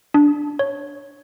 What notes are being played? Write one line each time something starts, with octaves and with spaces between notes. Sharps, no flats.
D4
C#5